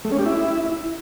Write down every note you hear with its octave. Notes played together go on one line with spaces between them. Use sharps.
A3
C#4
G4
E4